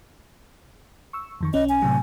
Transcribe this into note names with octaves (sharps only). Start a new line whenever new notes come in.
C#6 E6
F2 D#3 C#6
B1 C#4 D#5
G#5
A2 C3 F#3